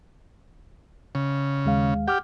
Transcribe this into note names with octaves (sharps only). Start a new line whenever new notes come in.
C#3
D#2 G#3 F5
G4 F#5 D6 F6